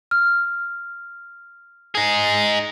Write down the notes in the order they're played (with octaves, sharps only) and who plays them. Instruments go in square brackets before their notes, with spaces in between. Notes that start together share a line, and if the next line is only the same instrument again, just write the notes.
[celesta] F6
[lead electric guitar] D#4 G#4